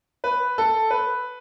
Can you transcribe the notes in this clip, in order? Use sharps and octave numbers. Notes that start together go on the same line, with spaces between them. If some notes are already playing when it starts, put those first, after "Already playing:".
B4
A4
B4